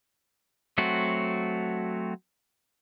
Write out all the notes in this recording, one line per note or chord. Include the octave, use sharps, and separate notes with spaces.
F#3 A3 C4 F#4